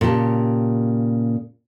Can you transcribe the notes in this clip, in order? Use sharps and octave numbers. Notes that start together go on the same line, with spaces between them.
A#2 C#3 G4 A5